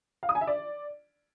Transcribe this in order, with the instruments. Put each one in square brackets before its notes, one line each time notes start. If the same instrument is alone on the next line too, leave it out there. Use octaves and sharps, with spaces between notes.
[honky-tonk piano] F5
D#6
G#5
E5
D5